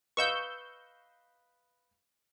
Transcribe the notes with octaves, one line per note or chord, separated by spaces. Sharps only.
B4 D#5 F5 C#6 E6 G6